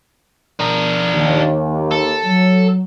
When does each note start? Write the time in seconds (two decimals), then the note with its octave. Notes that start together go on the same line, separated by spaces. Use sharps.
0.60 D4 A#4
1.12 D#2
1.92 A4
2.26 F#3